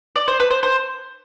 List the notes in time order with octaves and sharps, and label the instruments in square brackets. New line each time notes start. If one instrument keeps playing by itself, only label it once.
[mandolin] D5
C5
B4
C5
C5